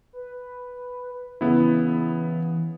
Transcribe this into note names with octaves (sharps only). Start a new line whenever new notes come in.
B4
C#3 E3 B3 E4